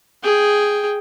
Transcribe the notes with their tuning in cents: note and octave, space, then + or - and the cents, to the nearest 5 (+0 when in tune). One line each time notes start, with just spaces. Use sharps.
G#4 +0 G5 +0